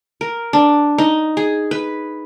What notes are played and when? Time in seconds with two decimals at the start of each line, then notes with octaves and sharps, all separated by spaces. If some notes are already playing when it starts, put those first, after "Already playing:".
0.21 A#4
0.53 D4
0.98 D#4
1.37 G#4
1.71 B4